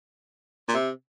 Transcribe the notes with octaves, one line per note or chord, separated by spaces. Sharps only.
A#2
C3